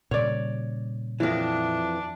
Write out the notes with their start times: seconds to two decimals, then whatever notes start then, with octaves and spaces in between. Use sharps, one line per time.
0.11 A#2 C#3 G3 C#5 D5
1.20 F2 E3 D4